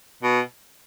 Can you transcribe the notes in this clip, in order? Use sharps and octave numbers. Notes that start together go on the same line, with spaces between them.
B2